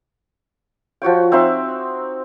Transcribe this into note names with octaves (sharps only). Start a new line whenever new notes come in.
F3 F#4 C#5 G5
C4 D#4 E5 C6